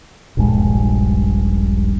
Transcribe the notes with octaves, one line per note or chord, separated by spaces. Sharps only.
D#1 A#1 G2 G#3